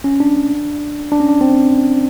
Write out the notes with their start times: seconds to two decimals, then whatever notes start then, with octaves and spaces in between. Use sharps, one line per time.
0.04 C#4
0.20 D4
1.12 D4
1.20 C#4
1.29 D4
1.41 C4